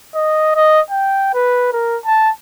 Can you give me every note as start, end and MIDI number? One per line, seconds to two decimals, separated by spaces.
0.15 0.55 75
0.55 0.81 75
0.90 1.32 79
1.34 1.68 71
1.73 1.97 70
2.06 2.30 81